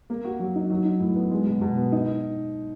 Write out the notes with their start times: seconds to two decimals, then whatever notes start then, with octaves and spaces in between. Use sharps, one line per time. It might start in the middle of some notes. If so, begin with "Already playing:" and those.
0.10 A#3
0.24 F#4
0.39 F#3
0.55 D#4
0.70 F#3
0.85 D#4
1.00 A2
1.15 B3
1.31 G#3
1.46 B2
1.61 B2
1.77 B3
1.92 D#4